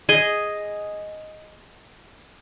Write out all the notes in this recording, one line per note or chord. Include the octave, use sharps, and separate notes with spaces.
G#4 D#5 G#5